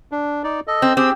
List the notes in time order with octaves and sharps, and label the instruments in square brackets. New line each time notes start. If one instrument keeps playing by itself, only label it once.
[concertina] D4
D#4 D5
A4 D#5
[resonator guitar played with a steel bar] C4
[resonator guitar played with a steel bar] C4 [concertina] G4 G#4 E6